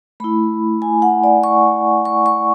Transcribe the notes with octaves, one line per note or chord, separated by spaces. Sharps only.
A3 E4 B5
G#5
F#5
D5
C#6
C#6
C#6